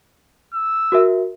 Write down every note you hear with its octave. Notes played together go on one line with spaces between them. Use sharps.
E6
F#4 A#4 E5